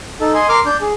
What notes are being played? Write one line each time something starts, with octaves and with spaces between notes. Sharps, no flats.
D#4 A4
D#5 G#5 C6
A#4 C6 D6 F6
D4 G6
G#4